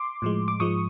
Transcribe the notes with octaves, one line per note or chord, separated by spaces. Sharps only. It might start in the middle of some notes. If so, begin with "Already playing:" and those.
Already playing: C6 D6
A2 F3 G#3
D6
G#2 F3 G#3 C#6 D#6